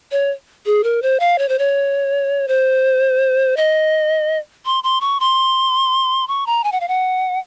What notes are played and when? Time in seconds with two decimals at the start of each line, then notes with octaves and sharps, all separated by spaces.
0.12 C#5
0.66 G#4
0.84 A#4
1.02 C5
1.20 F5
1.39 C#5
1.49 C5
1.59 C#5
2.48 C5
3.57 D#5
4.65 C6
4.84 C6
5.01 C#6
5.20 C6
6.28 C#6
6.47 A#5
6.64 G#5
6.72 F#5
6.80 F5
6.88 F#5